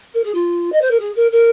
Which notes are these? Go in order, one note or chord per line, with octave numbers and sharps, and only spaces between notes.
A#4
G#4
F4
D#5
C5
A#4
G#4
A#4
A#4